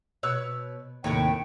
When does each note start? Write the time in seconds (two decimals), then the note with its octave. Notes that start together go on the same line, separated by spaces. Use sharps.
0.23 B2 C#5 E6 F#6
1.04 D#2 A2 C3 A3 C#5 G5